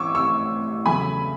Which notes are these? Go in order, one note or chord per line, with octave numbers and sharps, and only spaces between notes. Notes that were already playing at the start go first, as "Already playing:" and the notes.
Already playing: A2 E3 C#4 C#6 D6 E6
C#6 E6
E2 C#3 F#3 A3 G#5 B5